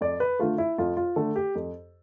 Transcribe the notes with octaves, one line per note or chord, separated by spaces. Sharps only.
F2 D5
B4
D3 A3 F4
E4
F2 F4
F4
D3 A3 A4
G4
F2